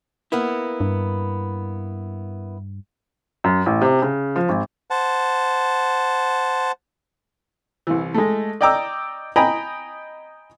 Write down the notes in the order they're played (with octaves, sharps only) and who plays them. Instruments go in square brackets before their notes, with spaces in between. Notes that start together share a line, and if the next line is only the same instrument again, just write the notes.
[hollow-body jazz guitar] A#3 B3 E4
[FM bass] G2
[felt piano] F#2
A1
C3
C#3
F3
G#1
[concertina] C5 F#5 A5
[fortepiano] C2 E3
G#3 A3
D5 D#5 G5 A#5 D6 E6
D#5 G5 G#5 A#5 B5